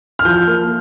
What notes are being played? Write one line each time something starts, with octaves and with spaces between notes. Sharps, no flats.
F6
F3 G6
A#3